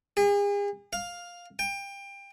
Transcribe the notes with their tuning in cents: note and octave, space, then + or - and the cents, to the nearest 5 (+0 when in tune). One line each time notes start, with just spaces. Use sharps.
G#4 -40
F5 +10
G5 +25